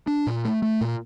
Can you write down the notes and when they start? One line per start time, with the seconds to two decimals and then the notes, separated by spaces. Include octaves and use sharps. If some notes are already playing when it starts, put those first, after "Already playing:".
0.07 D4
0.27 A#2
0.45 A3
0.62 A3
0.81 A#2